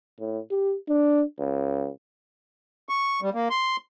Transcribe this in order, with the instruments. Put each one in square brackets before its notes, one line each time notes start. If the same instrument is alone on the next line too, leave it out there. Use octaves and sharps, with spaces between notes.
[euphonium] A2
G4
D4
C#2
[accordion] C#6
G3
A#3
C6